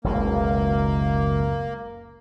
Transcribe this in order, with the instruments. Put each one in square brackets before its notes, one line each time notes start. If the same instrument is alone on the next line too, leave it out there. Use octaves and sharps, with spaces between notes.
[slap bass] F#1 C#2 B2 [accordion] A#3